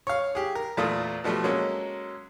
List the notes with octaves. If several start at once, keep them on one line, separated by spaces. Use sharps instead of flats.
C#5 F5
G4 G#4
A#4
E2 A#2 A3 F4 D#6
B2 F3 G3 A3
F#3 G#3 A#3 C#4 A4